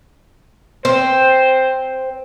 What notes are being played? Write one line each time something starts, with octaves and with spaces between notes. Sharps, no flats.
C4 C5